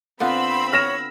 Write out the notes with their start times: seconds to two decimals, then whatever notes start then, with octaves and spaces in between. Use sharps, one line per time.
0.20 D3 B3 C4 F4 B5 C6 E6
0.72 C#5 F6 A#6 E7